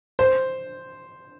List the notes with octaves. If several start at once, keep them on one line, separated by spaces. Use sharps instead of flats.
C5